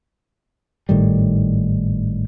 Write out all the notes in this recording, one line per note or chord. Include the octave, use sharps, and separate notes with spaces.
G#1 A2 D#3 G3